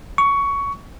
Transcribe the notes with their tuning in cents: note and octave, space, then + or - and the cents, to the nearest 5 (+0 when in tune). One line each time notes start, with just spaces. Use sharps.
C#6 +15